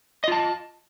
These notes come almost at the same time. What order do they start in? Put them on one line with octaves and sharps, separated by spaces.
D#5 F4 A5